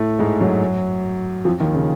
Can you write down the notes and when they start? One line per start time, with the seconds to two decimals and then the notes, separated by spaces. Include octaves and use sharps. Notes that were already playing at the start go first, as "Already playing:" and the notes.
Already playing: A2 A3
0.19 G#2 G#3
0.41 F#2 F#3
1.45 F2 F3
1.60 D#2 D#3
1.74 C#3